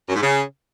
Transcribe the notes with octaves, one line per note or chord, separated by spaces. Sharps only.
F#2
G#2
C#3